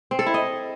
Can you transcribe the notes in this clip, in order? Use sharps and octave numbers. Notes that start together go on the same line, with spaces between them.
C4
A4
E4
D#5